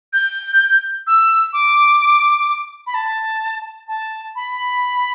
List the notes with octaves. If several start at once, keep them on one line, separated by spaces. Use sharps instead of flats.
G6
E6
D6
B5
A5
A5
B5